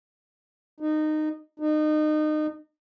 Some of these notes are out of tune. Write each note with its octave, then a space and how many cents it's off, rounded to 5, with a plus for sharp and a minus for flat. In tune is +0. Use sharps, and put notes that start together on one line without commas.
D#4 -20
D#4 -30